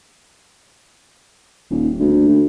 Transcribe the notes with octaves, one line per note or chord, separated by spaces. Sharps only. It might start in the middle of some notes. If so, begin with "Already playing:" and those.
D#1
D2
D2